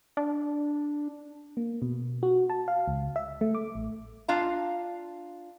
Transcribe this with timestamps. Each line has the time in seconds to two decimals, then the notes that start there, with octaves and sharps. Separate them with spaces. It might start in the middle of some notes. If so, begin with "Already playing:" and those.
0.17 D4
1.57 A#3
1.82 B2
2.23 F#4
2.50 A5
2.68 F5
2.88 C#2
3.16 E5
3.41 A3
3.55 D6
3.75 A1
4.28 D4 F4 F5 A#5